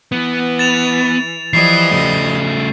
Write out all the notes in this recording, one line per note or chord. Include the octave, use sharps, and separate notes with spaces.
E3 B3
A6 E7 F7
E3 F3 G3 D#5 C7
C#3 A3